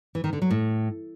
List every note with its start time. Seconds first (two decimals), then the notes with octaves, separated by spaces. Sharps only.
0.15 E3
0.24 D#3
0.33 D3
0.42 F#3
0.50 A2